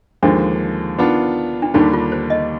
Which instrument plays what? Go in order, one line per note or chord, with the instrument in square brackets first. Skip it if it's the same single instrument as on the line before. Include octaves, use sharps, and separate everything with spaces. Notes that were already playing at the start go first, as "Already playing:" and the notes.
[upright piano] D#2 D3 F3 G#3 [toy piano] D4
[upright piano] D#3 B3 D4 F4
[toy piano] D4
[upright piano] D#2 D3 G3 D4 G4 [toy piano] D#4
[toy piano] F4
C5
D#5